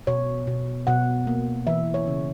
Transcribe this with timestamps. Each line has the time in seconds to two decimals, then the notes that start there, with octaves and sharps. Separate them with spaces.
0.07 B2 C#5
0.47 B2
0.87 B2 F#5
1.27 A#3
1.67 E3 E5
1.94 C#5
2.07 C#3